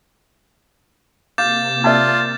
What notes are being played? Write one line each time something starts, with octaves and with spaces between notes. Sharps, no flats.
C3 A#3 F5 D6 G6 A6
F4 D5 E5 A5